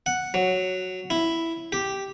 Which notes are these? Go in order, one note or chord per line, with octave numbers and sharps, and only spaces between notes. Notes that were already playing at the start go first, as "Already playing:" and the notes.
F#5
F#3
E4
G4